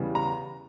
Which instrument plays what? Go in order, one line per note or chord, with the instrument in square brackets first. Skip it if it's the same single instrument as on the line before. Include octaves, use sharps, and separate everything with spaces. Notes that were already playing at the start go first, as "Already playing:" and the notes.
Already playing: [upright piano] E2 C#3 G3 B3
A#5